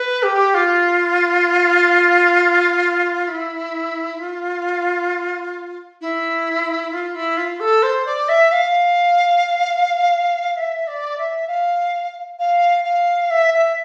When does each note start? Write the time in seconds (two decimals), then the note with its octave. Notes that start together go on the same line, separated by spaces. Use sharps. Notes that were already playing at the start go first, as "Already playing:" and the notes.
Already playing: B4
0.23 G4
0.54 F4
3.28 E4
4.18 F4
6.01 E4
6.92 F4
7.15 E4
7.37 F4
7.60 A4
7.83 C5
8.06 D5
8.29 E5
8.52 F5
10.57 E5
10.87 D5
11.18 E5
11.47 F5
12.39 F5
12.84 F5
13.30 E5
13.54 E5